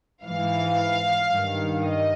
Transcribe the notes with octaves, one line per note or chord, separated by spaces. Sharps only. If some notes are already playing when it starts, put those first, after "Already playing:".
G#2 E3 F5
G2 D#3
D#5